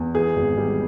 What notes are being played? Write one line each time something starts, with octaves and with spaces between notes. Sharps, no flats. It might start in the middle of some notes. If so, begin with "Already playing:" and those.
Already playing: E2
E3 G#4
G#1
G3